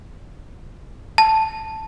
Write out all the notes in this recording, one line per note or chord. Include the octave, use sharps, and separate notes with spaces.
A5